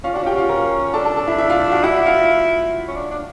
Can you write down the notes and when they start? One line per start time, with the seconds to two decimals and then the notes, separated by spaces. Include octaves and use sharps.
0.04 C#4 F4 F5
0.14 D4 F#4 F#5
0.23 C#4 G4 G5
0.38 F4 F5
0.49 A#4 A#5
0.93 D4 A4 A5
1.05 A4 A5
1.16 A4 A5
1.27 E4 E5
1.38 E4 E5
1.50 F4 F5
1.72 F#4 F#5
1.84 E4 F#4 F#5
2.06 F4 F5
2.88 C#4
2.96 D4
3.11 D4